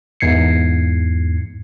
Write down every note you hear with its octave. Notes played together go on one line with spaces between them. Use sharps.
E2 G#2 G#6 C7 C#7